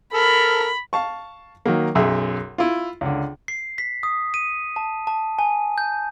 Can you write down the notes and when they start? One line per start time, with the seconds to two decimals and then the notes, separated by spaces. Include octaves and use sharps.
0.14 A4 A#4 B5
0.93 F5 A5 C#6
1.66 D#3 F#3 A#3
1.95 B1 F#2 G#4 E5
2.58 E4 F4
3.01 C#2 D3
3.48 C7
3.78 B6
4.03 D#6
4.34 D#7
4.76 A5
5.07 A5
5.39 G#5
5.78 G6